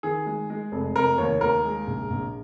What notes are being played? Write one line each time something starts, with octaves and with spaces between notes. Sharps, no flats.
D#3 G#4
G#3
G#3
F1
F1 A#4
D#2 C#5
D#2 A#4
G#3
A#1
A#1